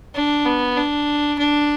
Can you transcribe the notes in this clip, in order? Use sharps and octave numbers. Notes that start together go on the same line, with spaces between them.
D4
B3
D4
D4